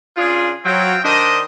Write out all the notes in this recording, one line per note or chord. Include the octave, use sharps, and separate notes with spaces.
C#3 D4 F4 G#4
F#3 C4 F4 G5
D#3 D4 C5 D#5